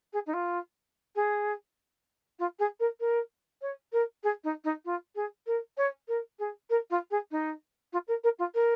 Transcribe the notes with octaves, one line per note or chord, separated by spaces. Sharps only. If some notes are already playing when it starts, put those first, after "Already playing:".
G#4
D#4
F4
G#4
F4
G#4
A#4
A#4
C#5
A#4
G#4
D#4
D#4
F4
G#4
A#4
C#5
A#4
G#4
A#4
F4
G#4
D#4
F4
A#4
A#4
F4
A#4